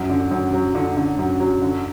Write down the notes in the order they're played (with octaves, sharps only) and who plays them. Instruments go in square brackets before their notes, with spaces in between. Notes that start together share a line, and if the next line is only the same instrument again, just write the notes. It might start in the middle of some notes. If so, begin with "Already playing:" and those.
Already playing: [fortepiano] F#2
D3
F#2
F#3
D3
D3
F#2
F#3
D3